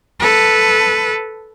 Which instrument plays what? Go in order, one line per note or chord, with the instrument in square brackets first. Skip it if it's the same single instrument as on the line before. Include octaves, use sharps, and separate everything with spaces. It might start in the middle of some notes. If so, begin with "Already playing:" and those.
[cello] A4 B4